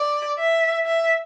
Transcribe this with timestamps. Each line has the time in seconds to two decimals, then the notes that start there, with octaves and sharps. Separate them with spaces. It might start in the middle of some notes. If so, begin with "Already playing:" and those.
Already playing: D5
0.39 E5
0.86 E5